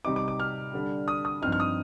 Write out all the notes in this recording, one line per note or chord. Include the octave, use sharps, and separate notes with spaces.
C3 G3 C4 D#4 D6
D6
D6
F6
D3 G3 D4
D#6
D#6
G2 F3 C4 D#4 F6
F6
D#6